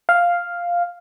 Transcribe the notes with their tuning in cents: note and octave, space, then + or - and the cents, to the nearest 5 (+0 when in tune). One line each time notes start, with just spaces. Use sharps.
F5 +0